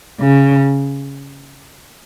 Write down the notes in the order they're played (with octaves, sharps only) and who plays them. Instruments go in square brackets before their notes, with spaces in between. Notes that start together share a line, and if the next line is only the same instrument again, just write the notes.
[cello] C#3